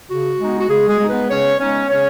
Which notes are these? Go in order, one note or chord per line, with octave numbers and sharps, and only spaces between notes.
C#3 F#4
G#3 B3 D#4
F#4
C#3 G#3 G#4
G#3 G#4
G#3 B3 D#4
B3 B4
C#3 C#4 C#5
G#3 B3 C#4 D#4 C#5
C#3 C#4 C#5